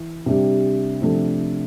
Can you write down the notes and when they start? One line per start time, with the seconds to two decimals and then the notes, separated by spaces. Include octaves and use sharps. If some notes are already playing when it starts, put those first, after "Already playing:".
Already playing: E3
0.26 C3 G3 D4 G4
1.02 C3 F3 A3 D4 A4